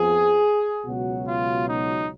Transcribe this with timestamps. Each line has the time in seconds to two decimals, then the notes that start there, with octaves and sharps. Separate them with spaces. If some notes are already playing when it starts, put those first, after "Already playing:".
Already playing: F2 F3 B3 G#4
0.84 C#2 B2 F#3 F#4
1.25 F4
1.68 D#4